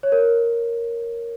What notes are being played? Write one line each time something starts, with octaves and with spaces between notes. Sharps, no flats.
C#5
A#4